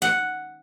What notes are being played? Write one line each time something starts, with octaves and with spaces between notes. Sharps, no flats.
F#5